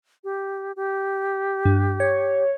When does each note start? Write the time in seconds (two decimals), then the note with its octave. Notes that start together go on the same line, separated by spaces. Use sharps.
0.24 G4
0.76 G4
1.65 G2
2.00 C#5